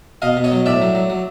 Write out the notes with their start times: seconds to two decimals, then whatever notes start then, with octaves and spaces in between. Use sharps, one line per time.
0.22 B2 D#5 F5
0.37 B2
0.44 C#5 D#5
0.52 F#3
0.66 A2 D5 E5
0.81 F#3
0.95 F#3
1.10 F#3